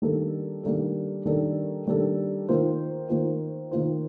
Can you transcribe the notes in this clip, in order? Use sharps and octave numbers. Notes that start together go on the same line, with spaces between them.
D#3 G3 A#3 D4 A4
D#3 G3 A#3 D4 A4
D#3 G3 A#3 D4 A4
D#3 G3 A#3 D4 A4
D#3 A#3 F4 C5
D#3 A#3 F4 C5
D#3 A#3 F4 C5